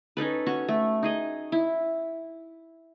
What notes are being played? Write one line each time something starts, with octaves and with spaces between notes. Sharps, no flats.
C#4 D#4 A4 B4
C#4 F#4 C#6
A3
D#4 G#4 D#5
E4